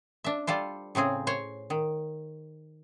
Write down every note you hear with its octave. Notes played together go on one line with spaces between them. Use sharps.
D4 E5
G3 F4 A4 C5
A2 C#3 C4 G#4
C5 C#5
D#3